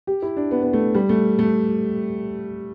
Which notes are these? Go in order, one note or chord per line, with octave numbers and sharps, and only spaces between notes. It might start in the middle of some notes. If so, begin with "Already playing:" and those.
G4
E4
D4
B3
B3
A3
G3
A3
A3